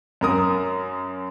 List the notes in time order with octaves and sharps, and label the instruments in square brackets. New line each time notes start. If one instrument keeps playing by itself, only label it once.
[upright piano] F#2 A#4 D#6